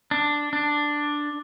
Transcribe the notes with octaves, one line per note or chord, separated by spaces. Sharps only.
D4
D4